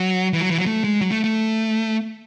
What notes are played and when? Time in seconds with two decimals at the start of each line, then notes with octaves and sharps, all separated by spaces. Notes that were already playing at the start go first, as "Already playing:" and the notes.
Already playing: F#3
0.33 E3
0.41 F#3
0.50 E3
0.58 F#3
0.66 A3
0.84 G#3
1.01 F#3
1.11 A3
1.24 A3